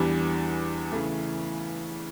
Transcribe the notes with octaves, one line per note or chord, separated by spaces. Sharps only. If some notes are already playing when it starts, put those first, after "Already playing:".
Already playing: E2 E3 G3 D4
C#3 E3 A3